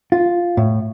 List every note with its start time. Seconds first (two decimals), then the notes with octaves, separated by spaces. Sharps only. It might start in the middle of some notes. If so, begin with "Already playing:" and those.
0.12 F4
0.57 A2